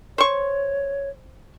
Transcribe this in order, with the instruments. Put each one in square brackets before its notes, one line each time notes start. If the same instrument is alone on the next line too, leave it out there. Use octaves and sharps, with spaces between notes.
[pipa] C5 C#6 [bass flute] C#5